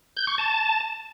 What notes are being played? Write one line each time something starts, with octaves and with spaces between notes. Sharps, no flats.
G6
C#6
A5